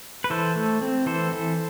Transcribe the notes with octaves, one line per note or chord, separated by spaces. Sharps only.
B4
E3 A4 C5
A3
C4
E3 A4 C5
E3